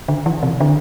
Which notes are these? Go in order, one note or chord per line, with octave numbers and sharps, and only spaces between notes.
D3
E3
C3
D3